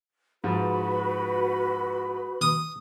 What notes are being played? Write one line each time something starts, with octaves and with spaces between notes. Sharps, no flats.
G#2 F3 F#4 B4 B5
D#6